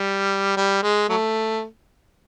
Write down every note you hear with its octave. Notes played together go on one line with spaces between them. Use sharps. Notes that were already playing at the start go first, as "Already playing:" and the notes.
Already playing: G3
G3
G#3
F#3 A3